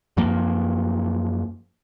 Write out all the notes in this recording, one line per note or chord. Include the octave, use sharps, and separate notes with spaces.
F#2 F3 A#3